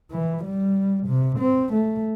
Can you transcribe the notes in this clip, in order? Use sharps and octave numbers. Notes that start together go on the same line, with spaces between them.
E3
G3
C3
C4
A3